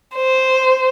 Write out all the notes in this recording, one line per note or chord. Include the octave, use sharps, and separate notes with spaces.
C5